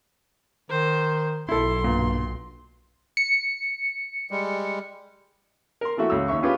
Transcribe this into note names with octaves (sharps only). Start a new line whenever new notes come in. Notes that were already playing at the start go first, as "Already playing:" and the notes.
D#3 C5
B1 E4 A4 C6
G2 A#2
C#7
G3 G#3
A#4 C6
E3 A3 F#4 E5
C#2 E6
D#2 E5 C#6
C#4 F4 G4 G#4 B4